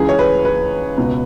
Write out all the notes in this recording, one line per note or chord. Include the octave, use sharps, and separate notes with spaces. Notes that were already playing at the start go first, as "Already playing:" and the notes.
Already playing: C#2 C#3 E3 G#4
C#5
B4
B4
C#2 B2